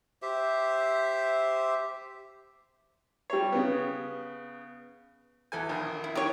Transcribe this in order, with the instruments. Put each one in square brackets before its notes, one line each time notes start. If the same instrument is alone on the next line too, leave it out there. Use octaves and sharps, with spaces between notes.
[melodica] G4 C5 E5
[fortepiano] G3 C#5
C#3 B3
E2 A4 G#5
A#1 D#3
[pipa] E4
[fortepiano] D#3 E3 [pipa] G4 C#5